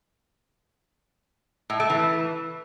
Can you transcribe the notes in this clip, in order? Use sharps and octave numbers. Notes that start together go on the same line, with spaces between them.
A2
A3
E3